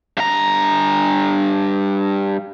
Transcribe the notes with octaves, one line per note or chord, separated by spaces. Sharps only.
G2 A#5